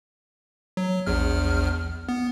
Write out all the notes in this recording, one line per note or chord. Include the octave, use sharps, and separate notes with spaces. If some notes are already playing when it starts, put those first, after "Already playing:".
F#3
A#1 E2 F6
B3